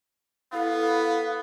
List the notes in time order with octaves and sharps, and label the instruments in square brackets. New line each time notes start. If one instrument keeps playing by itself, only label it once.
[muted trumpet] B3 [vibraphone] E4 A4 [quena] F5